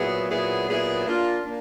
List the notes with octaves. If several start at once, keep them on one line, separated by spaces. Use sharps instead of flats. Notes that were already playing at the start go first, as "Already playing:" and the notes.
Already playing: A#2 F#3 B3 E4 G#4
A#2 F#3 B3 E4 G#4
A#2 F#3 B3 E4 G#4
A#3 D4 F4
A#3 D4